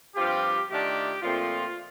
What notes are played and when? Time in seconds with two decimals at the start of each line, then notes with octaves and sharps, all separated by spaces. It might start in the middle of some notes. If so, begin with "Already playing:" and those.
0.15 G2 F3 C4 F4 G4
0.69 D#3 A3 D4 F4 G4
1.22 A#2 F3 A3 C4 F4